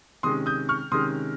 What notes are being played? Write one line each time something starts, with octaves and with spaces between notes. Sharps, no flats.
C3 D#3 G#3 C#4 C6 D#6
D#6 G6
C#6 F6
C3 D#3 G#3 C#4 C6 D#6